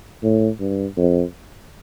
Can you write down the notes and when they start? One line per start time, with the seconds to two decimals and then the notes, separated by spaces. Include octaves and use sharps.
0.23 A2
0.60 G2
0.97 F2